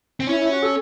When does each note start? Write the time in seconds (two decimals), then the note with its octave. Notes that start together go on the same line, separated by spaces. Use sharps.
0.20 C4
0.27 C#4 E4
0.39 E4
0.51 F#4
0.62 A4